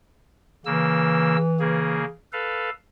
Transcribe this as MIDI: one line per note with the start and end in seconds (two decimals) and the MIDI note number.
0.66 1.37 49
0.66 2.14 52
0.66 1.37 58
0.66 1.37 88
1.60 2.05 49
1.60 2.05 58
1.60 2.05 68
2.33 2.70 69
2.33 2.70 71
2.33 2.70 77